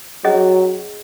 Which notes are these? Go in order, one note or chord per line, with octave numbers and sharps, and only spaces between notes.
F#3 C#4 G#4 D#5